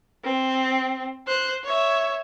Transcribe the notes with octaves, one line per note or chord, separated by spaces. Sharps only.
C4
C5 F#6
C#5 E5